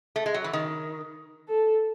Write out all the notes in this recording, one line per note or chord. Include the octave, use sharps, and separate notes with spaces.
A3
G#3
F#3
E3
D#3
A4